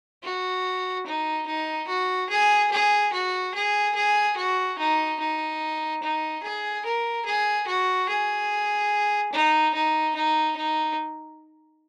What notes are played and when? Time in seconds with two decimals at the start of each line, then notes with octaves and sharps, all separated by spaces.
0.23 F#4
1.06 D#4
1.47 D#4
1.88 F#4
2.29 G#4
2.72 G#4
3.13 F#4
3.54 G#4
3.95 G#4
4.37 F#4
4.78 D#4
5.19 D#4
6.03 D#4
6.43 G#4
6.85 A#4
7.26 G#4
7.67 F#4
8.09 G#4
9.32 D#4
9.74 D#4
10.15 D#4
10.56 D#4